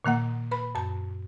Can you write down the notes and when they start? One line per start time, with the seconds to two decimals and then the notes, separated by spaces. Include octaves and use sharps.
0.05 A#2 D#3 A#3 F#5
0.51 B4 B5
0.75 F#2 A5